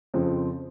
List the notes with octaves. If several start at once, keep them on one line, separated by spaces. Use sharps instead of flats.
F2 C#3 F3 C4